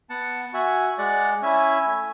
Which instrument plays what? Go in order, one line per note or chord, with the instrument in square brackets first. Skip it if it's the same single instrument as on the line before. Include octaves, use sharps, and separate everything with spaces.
[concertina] B3 F#5 A5
F#4 E5 G#5
G#3 D5 F#5
C#4 E4 E5 G#5
A3